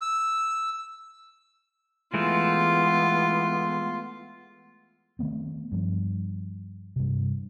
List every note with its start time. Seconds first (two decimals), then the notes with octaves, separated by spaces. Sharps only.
0.02 E6
2.14 E3 G#3 A3 B3 F4
5.19 D#3 A3 B3 C4
5.72 G2 F3
6.96 G2 C3